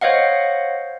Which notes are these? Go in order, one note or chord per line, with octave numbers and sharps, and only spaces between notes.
C5 C#5 D#5 F5 F#5